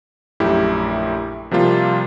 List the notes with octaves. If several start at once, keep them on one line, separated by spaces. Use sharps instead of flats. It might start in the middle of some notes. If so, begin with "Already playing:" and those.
A#1 F#2 A3 E4 G4
C3 F3 G3 A#3 F4